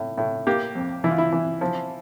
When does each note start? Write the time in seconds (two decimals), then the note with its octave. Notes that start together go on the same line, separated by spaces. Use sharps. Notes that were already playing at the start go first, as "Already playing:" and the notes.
Already playing: A2
0.18 A2
0.47 A#3 G4
0.75 F2
1.04 E3 E4
1.11 F4
1.18 E4
1.32 E3
1.61 F3